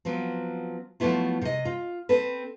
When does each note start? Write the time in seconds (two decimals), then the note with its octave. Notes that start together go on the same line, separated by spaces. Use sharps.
0.05 F3 F#3 B3 C4
1.00 F3 F#3 A3 B3 E4 F4
1.42 C3 D#5
1.65 F4
2.09 C4 A4 B4